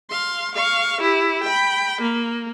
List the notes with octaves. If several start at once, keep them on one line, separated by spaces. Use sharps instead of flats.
F5 C6
F5 C#6
E4 G4
G5 B5
A#3